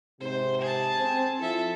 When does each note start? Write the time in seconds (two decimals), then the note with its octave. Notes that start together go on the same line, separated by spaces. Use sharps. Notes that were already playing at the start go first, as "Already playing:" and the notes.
0.21 G#2 C3 C5
0.61 G#4 A5
0.98 C4
1.40 F3 E4 A4 E5